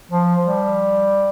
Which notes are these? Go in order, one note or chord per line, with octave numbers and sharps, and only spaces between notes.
F3
G3